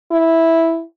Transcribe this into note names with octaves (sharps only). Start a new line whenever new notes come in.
E4